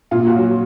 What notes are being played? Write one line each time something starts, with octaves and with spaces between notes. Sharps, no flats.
A#2 F4
F#4
F#3